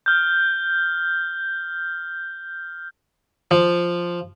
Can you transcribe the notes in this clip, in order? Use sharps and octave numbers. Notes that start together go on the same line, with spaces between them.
F6 G6
F3